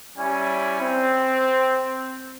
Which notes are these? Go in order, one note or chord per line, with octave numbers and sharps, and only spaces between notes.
G3 C#4 E4 G#5
C4